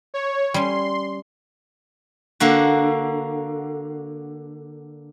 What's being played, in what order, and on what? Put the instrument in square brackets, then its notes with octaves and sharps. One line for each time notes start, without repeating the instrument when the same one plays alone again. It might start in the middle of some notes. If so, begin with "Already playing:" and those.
[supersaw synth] C#5
[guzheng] G3 C#4 [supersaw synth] C6
[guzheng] D3 A#3 F#4